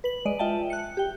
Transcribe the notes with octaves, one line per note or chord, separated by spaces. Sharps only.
B4 F#7
G#3 D5 D#5
F4 D#5 E5 G5 A5
F#6 C#7
G4 G5